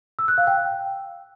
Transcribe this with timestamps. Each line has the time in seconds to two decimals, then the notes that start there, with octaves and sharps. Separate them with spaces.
0.19 E6
0.28 F#6
0.38 F5
0.47 G5